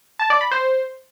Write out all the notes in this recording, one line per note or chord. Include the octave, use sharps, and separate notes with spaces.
A5
D5
B5
C5